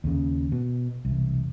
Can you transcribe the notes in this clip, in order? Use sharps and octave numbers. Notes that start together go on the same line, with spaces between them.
D#2 C#3
B2
E1 C2